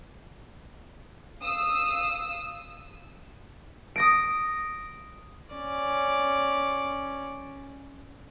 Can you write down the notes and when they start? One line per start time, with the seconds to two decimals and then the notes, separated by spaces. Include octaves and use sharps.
1.40 F5 D#6 E6
3.96 D#6 A#6 D7
5.54 C#4 D5